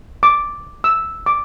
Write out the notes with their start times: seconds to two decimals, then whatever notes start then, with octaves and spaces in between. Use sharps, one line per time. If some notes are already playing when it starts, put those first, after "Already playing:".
0.23 D6
0.84 E6
1.26 D6